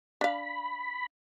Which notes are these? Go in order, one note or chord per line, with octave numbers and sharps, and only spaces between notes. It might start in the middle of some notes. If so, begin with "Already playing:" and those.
D4 F5 B5